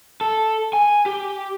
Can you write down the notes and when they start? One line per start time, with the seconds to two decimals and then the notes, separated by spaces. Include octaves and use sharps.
0.21 A4
0.73 G#5
1.06 G4